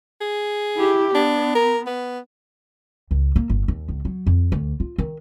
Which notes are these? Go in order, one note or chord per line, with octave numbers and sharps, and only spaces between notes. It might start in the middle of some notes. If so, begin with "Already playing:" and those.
G#4
E4 G4
B3 D4
A#4
B3
C#2
A#3
G1
D#2
C#2
F#3
F2
D2
F4
D#3